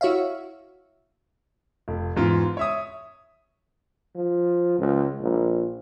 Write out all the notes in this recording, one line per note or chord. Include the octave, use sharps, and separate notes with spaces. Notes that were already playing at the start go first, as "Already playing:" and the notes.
E4 F#4 C#5 E5 F5
F1
E2 G#2 F4
C#5 E5 D#6
F3
C#2
A#1